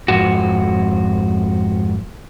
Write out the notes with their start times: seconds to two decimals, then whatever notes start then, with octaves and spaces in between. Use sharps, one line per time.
0.08 F2 G#2 F#4